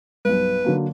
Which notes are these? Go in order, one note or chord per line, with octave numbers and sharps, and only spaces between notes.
B1 G2 B4
D3 F#3 A#3